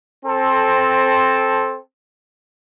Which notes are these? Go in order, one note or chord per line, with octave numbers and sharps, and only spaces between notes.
C4 A4